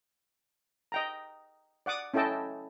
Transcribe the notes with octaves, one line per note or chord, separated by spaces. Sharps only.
D#5 G5 A#5
D5 F#5 D6 D#6
C#4 E4 A4 D#5 G5 A5